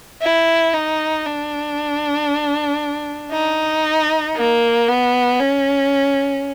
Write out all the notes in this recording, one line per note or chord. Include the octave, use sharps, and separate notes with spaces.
E4
D#4
D4
D#4
A#3
B3
C#4